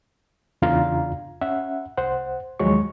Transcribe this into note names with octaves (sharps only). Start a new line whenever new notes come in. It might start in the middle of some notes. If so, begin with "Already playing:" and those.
E2 C#3 D4 F4 F5 A#5
C#4 E5 F#5
C2 C5 F#5
D#2 F3 F#3 G#3 C#5 C#6